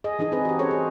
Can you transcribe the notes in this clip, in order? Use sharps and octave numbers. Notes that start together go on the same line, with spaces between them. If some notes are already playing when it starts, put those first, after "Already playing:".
G#4 D#5
E3 D4 D#4 G#4
C4 D#4 G#4 B4
F#4 G4
C#4 G#4 A4 C5 C#5
G#4